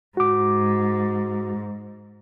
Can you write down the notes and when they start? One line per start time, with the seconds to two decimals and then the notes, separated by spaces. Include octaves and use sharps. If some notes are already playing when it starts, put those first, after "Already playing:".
0.17 G#2 F#4 D6